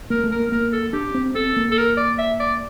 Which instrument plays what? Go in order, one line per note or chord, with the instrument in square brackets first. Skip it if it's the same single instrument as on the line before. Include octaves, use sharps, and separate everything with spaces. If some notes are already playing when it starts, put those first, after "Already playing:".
[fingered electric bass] A#3 [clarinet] A#4
[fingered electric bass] A3
[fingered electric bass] A#3 [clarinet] A#4
[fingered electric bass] A#3 [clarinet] A#4
[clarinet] A4
[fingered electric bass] D4 [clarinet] G4
[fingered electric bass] C4
[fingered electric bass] C4 [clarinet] A4
[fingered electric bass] A#3
[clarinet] A4
A#4
D5
E5
D5